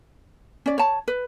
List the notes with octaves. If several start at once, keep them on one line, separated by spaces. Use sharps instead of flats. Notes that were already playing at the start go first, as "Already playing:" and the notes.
C#4 D5
C#5 A5
B4